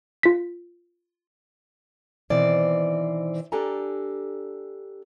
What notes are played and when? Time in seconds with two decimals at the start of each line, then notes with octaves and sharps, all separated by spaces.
0.23 F4 B6
2.30 B2 D#3 E3 C4 C5 D5
3.52 D4 G4 A4 G#5 A#5